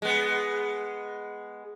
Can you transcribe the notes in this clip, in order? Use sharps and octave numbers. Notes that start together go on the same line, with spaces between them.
G#3 B3